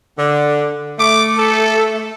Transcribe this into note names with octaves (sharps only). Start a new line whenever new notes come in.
D3
A3 D6
A4